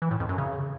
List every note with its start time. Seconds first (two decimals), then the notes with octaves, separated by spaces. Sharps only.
0.02 E3
0.11 A2
0.20 F2
0.29 F#2
0.38 C#3